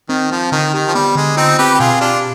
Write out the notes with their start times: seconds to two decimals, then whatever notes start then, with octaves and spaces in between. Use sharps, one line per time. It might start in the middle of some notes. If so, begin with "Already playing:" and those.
0.09 D#3 C4
0.31 F3 C4
0.52 D3 D#3
0.74 D#3 G4
0.88 F3
0.95 G3 B3
1.16 D3 G#3
1.37 C4 D#4 F4
1.59 C4 G4 B4
1.75 G4
1.80 B2 F4 G#4
2.01 D4 F4 G4